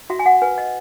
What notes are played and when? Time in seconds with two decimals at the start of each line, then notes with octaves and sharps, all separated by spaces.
0.10 F#4 E5
0.19 G#5
0.26 F#5
0.42 B4 G#5
0.58 D#5